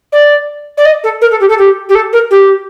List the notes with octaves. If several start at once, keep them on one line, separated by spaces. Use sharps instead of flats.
D5
D5
D#5
A4
A#4
A4
G4
A4
G4
G4
A4
A#4
G4